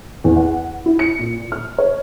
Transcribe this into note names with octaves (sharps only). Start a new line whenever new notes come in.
E2
F#5
E4
C#7
A#2
F6
C#5